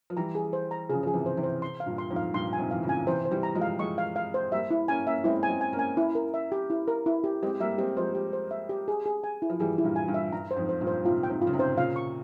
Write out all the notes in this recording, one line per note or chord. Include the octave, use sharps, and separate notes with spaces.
F3
E3 G3 A#5
G#4
C5
A#5
C#3 F3 G#4
F3 G#4
C3 E3
C5
C3 E3
C5
C6
F5
G2 A#2
C6
F2 G#2
F5
G2 A#2 C6
G#5
G#2 C3
E3 F5
A#2 C#3
G#5
C3 E3 C5
C5
E3 G3
A#5
F3 G#3
F5
F3 G#3 C#6
F5
F5
C5
G3 A#3 E5
E4
A#3 C#4 G#5
A#3 C#4 E5
G#3 C4 E4
G#5
G#3 C4
G#5
A#3 C#4
G#5
E4
A#4
E5
G4
E4
A#4
E4
G4
G#3 C4 G4
G3 A#3 E5
G#3 C4 G4
F3 G#3 C5
G4
C5
E5
G4
G#4
G#4
G#5
E4
F3
E3 G3 G#4
E4
G2 A#2
G#5
G2
E5
G2 A#5
C5
F2 G#2
C5
G2 A#2
C5
G#2 C3 F4
G5
G#2 C3
F4
C#3
G#2 C3
C5
A#2 C#3 F5
C#6